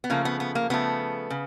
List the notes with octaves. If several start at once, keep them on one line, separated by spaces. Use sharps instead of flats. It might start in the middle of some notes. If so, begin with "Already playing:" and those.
B3
C#3 F3 A3 A#3
B3
B3
A#3
C#3 F3 A3 B3
C#3